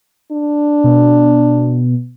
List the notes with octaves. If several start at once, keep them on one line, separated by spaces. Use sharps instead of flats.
D4
B2